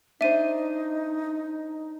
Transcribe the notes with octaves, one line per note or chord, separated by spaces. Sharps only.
D4 D#4 C5 E5 D#7